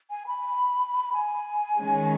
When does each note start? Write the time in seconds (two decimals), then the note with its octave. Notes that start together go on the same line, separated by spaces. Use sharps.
0.10 G#5
0.27 B5
1.13 G#5
1.81 D#3 G#3 C#4